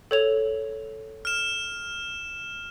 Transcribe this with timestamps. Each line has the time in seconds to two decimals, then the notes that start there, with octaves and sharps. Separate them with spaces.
0.11 A4 C#5 F7
1.25 F6 E7